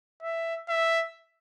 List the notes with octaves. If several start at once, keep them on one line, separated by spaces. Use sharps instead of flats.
E5
E5